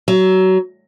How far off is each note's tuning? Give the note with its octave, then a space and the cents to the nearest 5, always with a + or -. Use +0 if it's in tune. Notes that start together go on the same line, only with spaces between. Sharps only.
F#3 +20